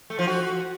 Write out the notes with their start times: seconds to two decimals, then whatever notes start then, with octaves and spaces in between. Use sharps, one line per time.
0.10 A3
0.19 F3
0.27 F#4